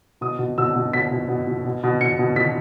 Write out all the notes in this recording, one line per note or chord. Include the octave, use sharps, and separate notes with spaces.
B2 D#6
B2
B2 E6
B2
B2 B6
B2
B2
B2
B2
B2
B2 C#7
B2
B2 B6